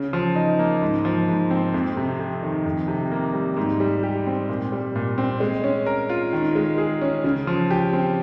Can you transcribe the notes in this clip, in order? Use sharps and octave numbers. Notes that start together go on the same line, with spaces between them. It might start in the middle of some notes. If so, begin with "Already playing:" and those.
Already playing: C#3
F3
D#4
A#3
G#2
F3
G#2
C4
F2
C3
F2
D#3
F2
C3
A#3
G3
G#2
G3
G4
C4
A#2
G3
A#2
C4
G#3
C#4
A#4
F4
D#3
G#3
G#4
C#4
C#3
F3
G4
C4